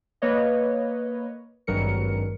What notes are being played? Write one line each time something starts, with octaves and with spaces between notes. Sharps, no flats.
A#3 B4 C#5 D#5
G#1 G2 F#3 A#4 C#7